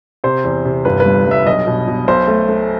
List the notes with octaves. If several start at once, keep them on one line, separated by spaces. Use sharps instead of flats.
C3 C5
E2
C3
G1 B4
B4
G2
G2
E5
B1 D#5
B2
B2
B1 C5
A3
A3